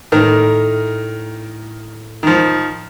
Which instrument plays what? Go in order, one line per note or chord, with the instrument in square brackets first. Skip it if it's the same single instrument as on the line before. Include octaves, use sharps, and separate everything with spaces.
[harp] A2 [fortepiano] D#3 A#4
[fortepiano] D#3 F3